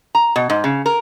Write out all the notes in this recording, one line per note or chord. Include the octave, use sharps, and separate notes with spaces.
A#5
B2
G#2
C#3
A#4